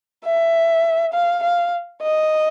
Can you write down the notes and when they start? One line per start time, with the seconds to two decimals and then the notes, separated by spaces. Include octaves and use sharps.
0.25 E5
1.14 F5
1.44 F5
2.02 D#5